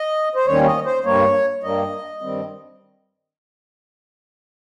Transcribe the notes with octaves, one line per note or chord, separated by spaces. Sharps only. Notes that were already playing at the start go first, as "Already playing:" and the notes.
Already playing: D#5
C5
D#2 D#3 G3 C#4 C#5
D#5
C5
G2 G3 A#3 C#5
G2 G3 A#3 D#5
G2 D#3 G3 C4